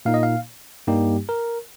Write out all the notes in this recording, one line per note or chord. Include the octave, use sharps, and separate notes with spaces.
A#2 A#3 D#4 F5
D#5
F5
G2 G3 A#3 D#4 G4
A#4